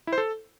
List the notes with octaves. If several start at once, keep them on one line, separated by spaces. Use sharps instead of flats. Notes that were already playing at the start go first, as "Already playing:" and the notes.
E4
C5
A4